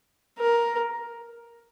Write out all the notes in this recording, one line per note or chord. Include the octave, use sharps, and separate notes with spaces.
A#4